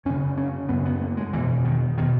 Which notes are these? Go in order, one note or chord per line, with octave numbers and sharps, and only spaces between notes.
F#2 C#3 C#4
C#4
F#2 C#3 B3
B3
A#3
G#3
E2 B2 E3
D#3
B2 D#3